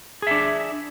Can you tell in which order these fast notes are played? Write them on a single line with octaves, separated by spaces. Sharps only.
G#4 E5 D4